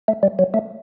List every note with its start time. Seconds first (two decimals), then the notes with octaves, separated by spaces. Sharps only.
0.08 A3
0.23 G3
0.39 F#3
0.54 A3